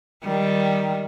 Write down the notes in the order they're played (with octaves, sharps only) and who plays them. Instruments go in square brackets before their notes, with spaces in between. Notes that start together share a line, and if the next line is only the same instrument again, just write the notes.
[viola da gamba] D#3 G3